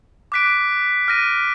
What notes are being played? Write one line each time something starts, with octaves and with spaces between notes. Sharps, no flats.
D6 F#6 B6 D7
F6 A#6 D#7